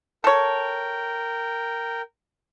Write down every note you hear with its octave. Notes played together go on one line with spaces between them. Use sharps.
A4 A#4 C#5 G5